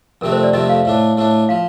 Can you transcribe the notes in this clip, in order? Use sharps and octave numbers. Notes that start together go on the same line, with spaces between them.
F2 C3 D#3 A3 C4 A#4
C5
D5
F2 C3 D#3 A3 C4 D#5
F5
A2 A3 D4
A2 A3 D4
F3 F5